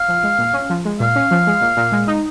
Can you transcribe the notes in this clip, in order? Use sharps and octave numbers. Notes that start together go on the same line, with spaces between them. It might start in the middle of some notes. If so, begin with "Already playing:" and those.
Already playing: F5
F3
G#3
A#2
C#4
F3
G#3
A#2 F5
C#4
F3
G#3
A#2
A#2
G#3
D#4